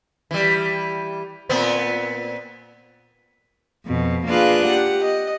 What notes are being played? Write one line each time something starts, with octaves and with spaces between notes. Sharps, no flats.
E3 G3
A#2 B3 C4
F2 B2
A#3 D4 F4 G#4 B4 F#6
G4 F#5
D#5